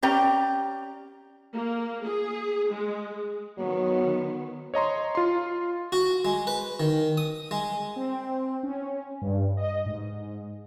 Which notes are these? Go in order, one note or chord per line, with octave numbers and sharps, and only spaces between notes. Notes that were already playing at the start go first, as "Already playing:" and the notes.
C#4 G4 D5 A#5
A#3
G#4
G#3
D#3 F#3 B3
C#5 D#5 A#5 C6
F4 C6
F#4
G#3
B4
D#3
D#6
G#3
C4
C#4
G2
D#5
G#2